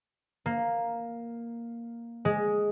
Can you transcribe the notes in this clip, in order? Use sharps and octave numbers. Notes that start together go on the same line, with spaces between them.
A#3
G#3